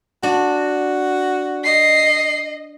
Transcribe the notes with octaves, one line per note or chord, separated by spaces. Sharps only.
D4 F#4
D#5 C7